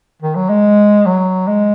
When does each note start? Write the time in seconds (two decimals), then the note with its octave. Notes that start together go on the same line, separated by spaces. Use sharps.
0.22 D#3
0.36 F#3
0.49 G#3
1.06 F#3
1.48 G#3